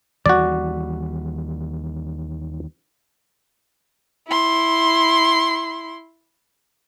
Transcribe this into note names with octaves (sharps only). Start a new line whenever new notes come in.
D#2 E3 G3 F#4 D5
E4 C6